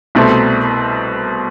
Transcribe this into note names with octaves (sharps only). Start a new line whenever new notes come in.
C2 B2 A3 C4